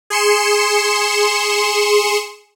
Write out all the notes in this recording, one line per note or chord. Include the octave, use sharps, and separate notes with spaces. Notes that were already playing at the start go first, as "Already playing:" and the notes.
G#4 C6 C#7 E7